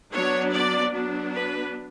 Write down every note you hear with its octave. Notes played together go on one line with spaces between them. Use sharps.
F#3 B3 D4 C#5
D5
F#3 B3 D4
B4